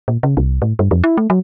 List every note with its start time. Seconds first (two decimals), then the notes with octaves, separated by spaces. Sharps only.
0.08 A#2
0.23 C#3
0.37 C2
0.62 A2
0.79 G2
0.91 F2
1.04 E4
1.17 A3
1.30 F#3